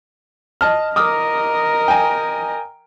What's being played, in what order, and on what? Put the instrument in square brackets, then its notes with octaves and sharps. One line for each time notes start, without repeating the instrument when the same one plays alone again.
[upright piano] D#5 A5 F6
[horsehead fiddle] A#4 D#5 [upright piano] D6 D#6 F6
[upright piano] G5 G#5